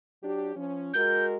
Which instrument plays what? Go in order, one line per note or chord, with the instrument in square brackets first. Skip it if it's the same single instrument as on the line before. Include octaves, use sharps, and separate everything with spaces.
[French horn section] F#3 D4 G4
F3 C#4
[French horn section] G#3 F#4 A#4 [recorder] G6